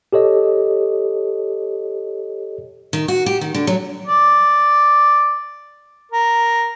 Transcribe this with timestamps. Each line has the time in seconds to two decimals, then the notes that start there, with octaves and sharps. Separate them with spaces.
0.13 G4 A4 C#5 D#5
2.93 D#3
3.08 F#4
3.26 G4
3.41 D#3
3.54 D3
3.67 F#3
4.06 D5
6.12 A#4